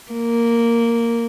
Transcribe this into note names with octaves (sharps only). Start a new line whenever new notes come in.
A#3